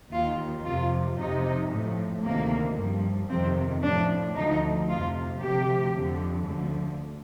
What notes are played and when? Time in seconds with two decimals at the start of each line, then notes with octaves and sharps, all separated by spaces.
0.11 D#2 D#3 F4
0.64 F2 C3 F3 F4
1.17 F2 C3 F3 D#4
1.70 A2 F3
2.23 D2 C3 D#3 A#3
2.77 G2 F3
3.29 F2 C3 D#3 C4
3.83 A2 F3 D4
4.36 D2 D3 F3 D#4
4.88 F2 C3 F3 F4
5.41 D2 C3 F3 G4
5.94 F2 D3 F3
6.47 D2 D3 F3